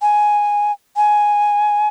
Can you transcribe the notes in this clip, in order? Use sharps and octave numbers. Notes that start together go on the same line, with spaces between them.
G#5
G#5